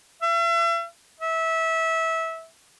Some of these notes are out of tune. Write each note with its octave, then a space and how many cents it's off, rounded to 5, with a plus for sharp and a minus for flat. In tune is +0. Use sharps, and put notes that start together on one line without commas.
E5 +40
E5 -20